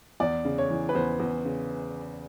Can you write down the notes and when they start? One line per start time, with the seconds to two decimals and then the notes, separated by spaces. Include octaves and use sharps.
0.20 E2 D5
0.45 C#3
0.58 C#5
0.70 E3
0.89 B4
0.95 E2 C5
1.19 E2
1.45 C#3